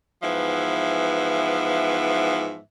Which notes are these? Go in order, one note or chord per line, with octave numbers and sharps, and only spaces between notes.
G#2 E3 F3 B3 E5